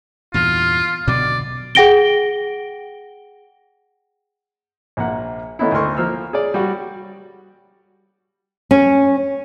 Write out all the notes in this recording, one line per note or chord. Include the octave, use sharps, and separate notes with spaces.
E2 G2 A#2 F4
B2 D3 F#3 D5
G#4 F#5 G5 A#6 D7 G7
A#1 A#3 F#5
D#3 A3 B3 C#4 D#4 E4
D2 A3 A#4 C6 C#6
F3 A#3 E6 F6
G#4 C#5 D5
G3 F#4
C#4